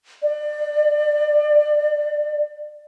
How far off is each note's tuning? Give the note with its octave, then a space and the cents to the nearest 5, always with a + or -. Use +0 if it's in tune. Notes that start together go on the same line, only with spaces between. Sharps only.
D5 +25